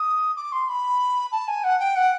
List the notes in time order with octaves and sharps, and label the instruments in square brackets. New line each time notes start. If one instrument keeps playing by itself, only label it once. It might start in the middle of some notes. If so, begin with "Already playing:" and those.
Already playing: [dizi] D#6
D6
C6
B5
A5
G#5
F#5
G5
F#5